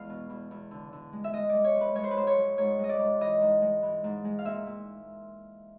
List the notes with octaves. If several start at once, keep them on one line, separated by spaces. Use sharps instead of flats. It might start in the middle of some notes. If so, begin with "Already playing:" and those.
Already playing: E2 G#3 F5
B2
E2
E2
D3
D3
G#3
E5
G#3 D#5
G#3 D5
C#5
F3
B4
G#3 C#5
C5
B4
G#2 C5
C#5
F3
G#2 C#5
G#3 D#5
D5
G#2
E3 D#5
G#2
G#3
E3
G#2
G#3
F5
A#2 E5
A#2